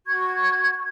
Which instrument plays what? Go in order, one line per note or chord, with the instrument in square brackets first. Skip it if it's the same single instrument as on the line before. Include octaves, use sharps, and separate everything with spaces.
[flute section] F#4 C#6 G#6